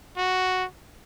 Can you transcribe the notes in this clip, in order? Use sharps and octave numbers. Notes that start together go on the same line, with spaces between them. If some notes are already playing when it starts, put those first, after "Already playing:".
F#4